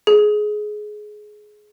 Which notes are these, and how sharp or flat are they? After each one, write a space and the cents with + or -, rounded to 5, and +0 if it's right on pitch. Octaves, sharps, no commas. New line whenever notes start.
G#4 +20